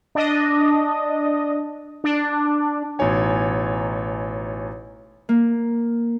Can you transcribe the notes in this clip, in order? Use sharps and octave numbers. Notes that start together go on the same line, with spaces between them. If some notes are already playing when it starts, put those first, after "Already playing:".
D4 D#5
D4
A1 B2 D#4 C#5 G#5
A#3